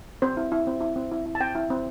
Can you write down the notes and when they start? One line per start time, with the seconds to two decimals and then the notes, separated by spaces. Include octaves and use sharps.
0.22 C4 C5
0.37 E4
0.52 E4
0.67 C4
0.81 E4
0.96 C4
1.12 E4
1.26 E4
1.35 A5
1.40 C4 G5
1.55 E4
1.70 C4